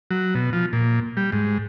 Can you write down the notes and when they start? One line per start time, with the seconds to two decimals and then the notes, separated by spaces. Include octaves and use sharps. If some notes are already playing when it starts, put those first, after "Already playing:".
0.11 F#3
0.35 B2
0.53 F3
0.73 A#2
1.17 G3
1.32 G#2